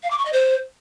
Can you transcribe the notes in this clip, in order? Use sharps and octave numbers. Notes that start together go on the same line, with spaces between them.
F5
D6
C#6
D#5
C5